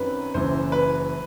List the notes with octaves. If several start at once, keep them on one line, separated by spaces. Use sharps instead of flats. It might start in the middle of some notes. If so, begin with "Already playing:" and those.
Already playing: F#2 D#3 F#3 C4 B4
F#1 F#2 E3 C5
B4